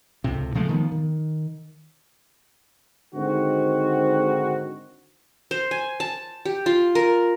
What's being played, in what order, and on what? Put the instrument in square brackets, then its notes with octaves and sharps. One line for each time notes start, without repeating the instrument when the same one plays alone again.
[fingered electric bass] C#2 A2 C3
C#3 F3 G#3 A3
D#3 F3 B3
D#3
[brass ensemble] G#2 D3 D#3 C4 F#4
[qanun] C5
G#5
A5
G4
F4
A#4